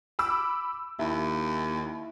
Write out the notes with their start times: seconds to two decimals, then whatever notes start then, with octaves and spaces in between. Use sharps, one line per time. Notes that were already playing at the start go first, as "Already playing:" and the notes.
0.19 B5 D6 E6
0.99 D#2 E4